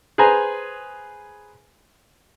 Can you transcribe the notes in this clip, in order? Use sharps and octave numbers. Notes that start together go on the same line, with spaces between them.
G#4 B4 C5 G#5 A#5